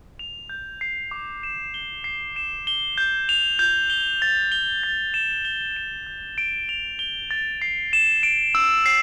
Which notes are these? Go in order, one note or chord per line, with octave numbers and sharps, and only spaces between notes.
F7
G6
C7
D6
E7
G7
C7
E7
G7
G6
F7
G6
G7
A6
G7
A6
E7
G7
E7
G6
D7
F7
G7
A6
C7
E7
D7
E6
C7